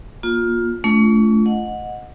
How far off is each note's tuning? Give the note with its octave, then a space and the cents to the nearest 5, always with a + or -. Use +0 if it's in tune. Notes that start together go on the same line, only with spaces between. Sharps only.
A#3 +25 F4 +15
A3 -15 C#4 +40 F4 -35
D#5 +0 F#5 -20